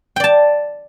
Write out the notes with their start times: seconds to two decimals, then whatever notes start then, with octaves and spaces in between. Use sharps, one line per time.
0.16 G5
0.20 D5
0.24 A5